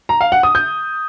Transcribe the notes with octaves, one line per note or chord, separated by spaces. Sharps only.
A#5
F5
F#5
D#6
G6